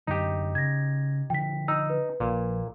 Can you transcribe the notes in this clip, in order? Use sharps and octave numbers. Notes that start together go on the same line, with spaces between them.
F#2 D3 F#3 D#4 G4
C#3 G#6 A#6
D3 F3 G5 B6
D#4 E6
B4
A#1 A#2 F3